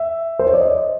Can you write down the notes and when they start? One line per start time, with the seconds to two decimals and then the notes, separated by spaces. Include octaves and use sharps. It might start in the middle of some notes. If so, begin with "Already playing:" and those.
Already playing: E5
0.39 C5
0.47 C#5
0.54 D5
0.61 D#5